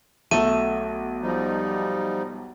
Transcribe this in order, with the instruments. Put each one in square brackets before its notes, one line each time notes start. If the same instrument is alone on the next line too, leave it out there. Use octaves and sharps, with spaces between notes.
[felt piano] B1 [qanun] A3 A4 [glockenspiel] D#7
[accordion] F3 G3 D#4